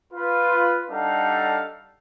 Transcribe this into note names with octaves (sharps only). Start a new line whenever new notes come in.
F4 B4
G3 D4 D#4 A4 F5 F#5